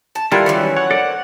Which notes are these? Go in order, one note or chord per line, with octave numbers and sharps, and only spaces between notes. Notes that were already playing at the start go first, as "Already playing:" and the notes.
A5
D#3 G3 E4 F4 A4 A#4 E5 F#6
E3 F#3 C#4
C#5 F#5
A4 A#4 C5 D5